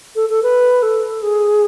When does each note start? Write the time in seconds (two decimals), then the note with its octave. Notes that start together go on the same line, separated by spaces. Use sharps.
0.16 A4
0.29 A4
0.43 B4
0.82 A4
1.22 G#4